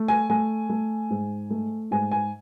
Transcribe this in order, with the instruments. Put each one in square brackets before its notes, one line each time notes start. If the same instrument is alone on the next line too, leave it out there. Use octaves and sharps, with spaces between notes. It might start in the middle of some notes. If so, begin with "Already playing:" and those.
Already playing: [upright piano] A3
G#5
A3 G#5
A3
G#2
A3
G#2 G#5
G#5